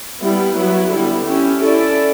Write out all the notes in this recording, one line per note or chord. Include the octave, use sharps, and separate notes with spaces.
G3 B3 E4
F#3 B3 E4
D3 G3 B3 E4
C#4 E4 G4
C#4 E4 A4 D5